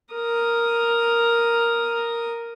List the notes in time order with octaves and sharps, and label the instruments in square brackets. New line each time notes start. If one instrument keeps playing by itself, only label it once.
[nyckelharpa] A#4 D#6